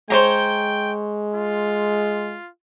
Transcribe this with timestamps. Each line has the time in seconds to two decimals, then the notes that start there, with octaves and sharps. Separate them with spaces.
0.10 G#3 C5 C#5 G5 A#5
1.35 F4